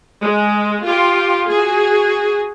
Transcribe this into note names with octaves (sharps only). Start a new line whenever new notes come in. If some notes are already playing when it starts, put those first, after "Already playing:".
G#3
F4 G4
F#4 G#4